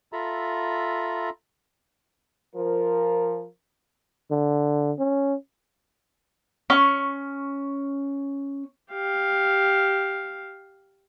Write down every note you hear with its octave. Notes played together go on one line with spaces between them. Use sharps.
F4 A4 E5 A#5 B5
F3 A#4
D3
C#4
C#4 C#6
G4 F5